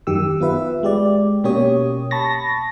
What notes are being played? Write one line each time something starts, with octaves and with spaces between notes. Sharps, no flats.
F#2 D#3 G4 E6
B3 F4 B4 E5
G#3 G4 D5
B2 A#3 C#4 G4 C#5 D#6
A5 B5 C#6 A6 A#6